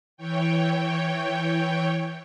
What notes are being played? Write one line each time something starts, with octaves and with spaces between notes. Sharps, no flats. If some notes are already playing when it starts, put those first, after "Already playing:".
E3 C#5 G5